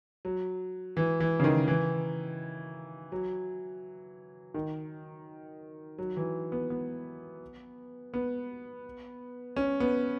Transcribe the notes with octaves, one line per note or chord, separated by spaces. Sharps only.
F#3
E3
E3
C#3
D#3
E3
F#3
D#3
F#3
E3
B3
B3
B3
C#4
B3